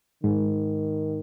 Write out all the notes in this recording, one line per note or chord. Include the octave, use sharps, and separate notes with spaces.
G#2 D#3